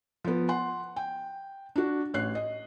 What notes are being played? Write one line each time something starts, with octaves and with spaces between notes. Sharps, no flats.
F3 B3
F#5 C6
G5
D4 F#4
A1 C#5 F#6 C7
D#5